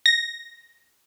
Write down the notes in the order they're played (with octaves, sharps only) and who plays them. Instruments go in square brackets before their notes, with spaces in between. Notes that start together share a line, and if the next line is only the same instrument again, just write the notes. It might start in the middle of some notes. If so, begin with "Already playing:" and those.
[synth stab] A#6